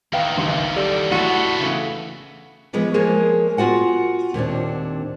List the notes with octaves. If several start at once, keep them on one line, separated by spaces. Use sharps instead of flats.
E2 D#3 B4 F5 G5
G#1 C#2 E3
G3 A4
A1 B3 E4 F#4 A4
C#3 E3 A3
E3 F3 G#3 B3
F3 G#3 A#3 G#4 A#4 C#5
B3 F4 F#4 F#5 G#5
D#2 A#2 C4 D4